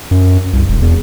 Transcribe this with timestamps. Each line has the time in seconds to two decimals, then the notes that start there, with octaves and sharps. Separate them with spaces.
0.11 F#2
0.53 C2
0.68 E1
0.82 E2